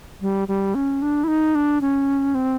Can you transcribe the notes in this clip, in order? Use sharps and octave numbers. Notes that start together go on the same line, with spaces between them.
G3
G3
C#4
D4
E4
D#4
D4
C#4
C4